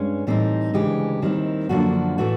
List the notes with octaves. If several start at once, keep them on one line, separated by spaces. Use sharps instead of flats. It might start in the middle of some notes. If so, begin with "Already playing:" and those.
Already playing: G2 G#3 C#4
A2 E3 G3 C4 D#4
D2 C#3 E3 G#3 G4
D#2 D#3 G3 C4 E4
F#2 D3 F3 A#3 D4 F#4
A2 E3 A3 F#4